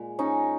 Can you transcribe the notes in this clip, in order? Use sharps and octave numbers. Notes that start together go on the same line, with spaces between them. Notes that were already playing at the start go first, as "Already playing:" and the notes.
Already playing: A#2 G#3
C#4 D#4